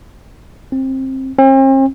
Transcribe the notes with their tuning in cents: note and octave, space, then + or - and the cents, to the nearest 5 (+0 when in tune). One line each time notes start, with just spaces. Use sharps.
C4 +20
C4 +45